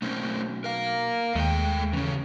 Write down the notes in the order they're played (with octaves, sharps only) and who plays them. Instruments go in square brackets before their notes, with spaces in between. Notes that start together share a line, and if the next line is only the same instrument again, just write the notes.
[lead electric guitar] B1 [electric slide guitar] A3 C4 C#4
[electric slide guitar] A#4 F5
[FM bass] D#2 [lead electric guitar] G#3 [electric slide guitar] A3 G5
[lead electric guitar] C#3 [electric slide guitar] E3 C#4